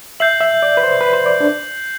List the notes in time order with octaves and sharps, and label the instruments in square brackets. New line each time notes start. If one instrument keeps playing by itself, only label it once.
[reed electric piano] E5 [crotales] G6 C7 F#7
[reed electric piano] E5
D5
B4
C5
B4
C5
D5
D4